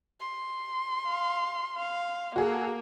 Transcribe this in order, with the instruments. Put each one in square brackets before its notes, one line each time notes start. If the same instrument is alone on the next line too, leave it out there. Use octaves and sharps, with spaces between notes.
[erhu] C6
[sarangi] F5
F5
[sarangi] A#3 [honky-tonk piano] F#4 G#4 A4